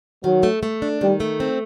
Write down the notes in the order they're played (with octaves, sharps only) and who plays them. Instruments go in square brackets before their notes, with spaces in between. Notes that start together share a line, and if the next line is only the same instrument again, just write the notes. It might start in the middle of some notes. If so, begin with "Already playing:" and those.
[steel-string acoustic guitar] D#3 [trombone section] F#3
[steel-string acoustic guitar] A3
A3
D4
[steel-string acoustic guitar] D#3 [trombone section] G3
[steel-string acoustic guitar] A3
C4